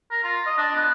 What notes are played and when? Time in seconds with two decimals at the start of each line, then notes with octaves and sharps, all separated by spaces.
0.11 A#4
0.24 F4
0.47 D#5
0.58 D4
0.75 B3